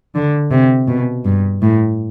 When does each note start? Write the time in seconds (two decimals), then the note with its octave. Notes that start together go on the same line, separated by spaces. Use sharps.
0.15 D3
0.51 C3
0.88 B2
1.25 G2
1.62 A2